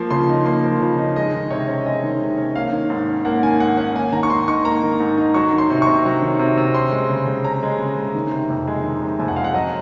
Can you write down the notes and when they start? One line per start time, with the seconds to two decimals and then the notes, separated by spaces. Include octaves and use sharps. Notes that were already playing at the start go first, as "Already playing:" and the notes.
Already playing: F3 A#3 C6
0.10 C#3 C6
0.29 D#4
0.46 A#3 C6
0.64 F3
0.81 C#3
0.98 D#4
1.16 G#3 D#5
1.33 D#3
1.50 C3 C#5
1.68 C#4
1.86 G#3 D#5
2.04 D#3
2.21 C3
2.38 C#4
2.56 A#3 F5
2.73 D#3
2.90 G#2
3.08 C#4
3.25 A#3 F#5
3.43 D#3 G#5
3.60 G#2 F#5
3.77 C#4 F#5
3.95 A#3 G#5
4.13 D#3 A#5
4.23 C#6
4.30 G#2 C6
4.48 D#4 C#6
4.65 A#3 A#5
4.83 D#3
5.00 G#2
5.18 D#4
5.34 F#3 C#6
5.52 D#3
5.58 C6
5.70 C3
5.82 C#6
5.87 C3
6.05 F#3
6.22 D#3
6.39 C3
6.57 C3
6.74 C#4 C6
6.92 G#3
7.10 C#3
7.27 C#3
7.44 C#4 A#5
7.63 G#3
7.79 C#3
7.97 C#3
8.15 D#3
8.31 C3
8.50 F2
8.67 G#3
8.84 D#3
9.02 C3
9.20 F2 G#5
9.28 F#5
9.36 G#3 F5
9.44 F#5
9.54 F#3 D#5